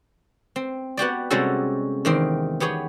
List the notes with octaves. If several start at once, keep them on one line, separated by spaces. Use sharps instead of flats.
C4
B3 F#4 G4 D5
C3 G3 G#3 C#4 F#4 A4
E2 D#3 C4
B3 G4 G#4 C#5